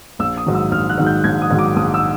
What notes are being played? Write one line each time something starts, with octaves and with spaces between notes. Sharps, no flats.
A#1 E6
D#6
G#2 D#3 F#3
E6
A#1 F6
F#6
G#2 D#3 F#3
G6
A#1 G#6
D#6
G#2 D#3 F#3
D6
A#1 D#6
E6